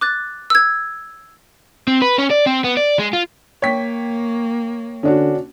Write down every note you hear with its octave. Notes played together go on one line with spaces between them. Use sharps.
D6 F#6 A6
E6 G#6
C4
B4
C#4
D5
C4
B3
D5
G#3
F4
A#3 C#5 G5 B6
D3 C#4 D4 F#4